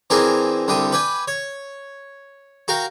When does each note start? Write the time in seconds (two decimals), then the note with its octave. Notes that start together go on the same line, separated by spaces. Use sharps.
0.10 E3 C4 D4 G#4 A#4 C5
0.68 C2 D3 G3 G5 D#6
0.92 B4 D5 G5 G#5
1.28 C#5
2.68 F#4 A#4 F5 G5